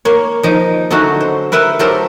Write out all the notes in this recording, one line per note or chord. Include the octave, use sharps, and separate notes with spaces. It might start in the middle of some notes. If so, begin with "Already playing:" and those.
A#3 C#5
F3 D#4
D3 F#3 A3 C#4 D#4 F#4
C5
A#4 B4 E5 F#5 G5
F#3 A3 G4 A4 A#4 C5